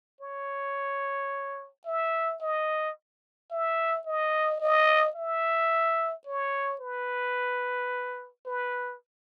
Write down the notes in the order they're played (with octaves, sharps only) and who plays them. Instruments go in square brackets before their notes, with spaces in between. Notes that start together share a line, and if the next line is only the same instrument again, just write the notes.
[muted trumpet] C#5
E5
D#5
E5
D#5
D#5
E5
C#5
B4
B4